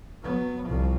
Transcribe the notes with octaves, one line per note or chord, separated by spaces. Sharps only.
F#3 B3
C2 F3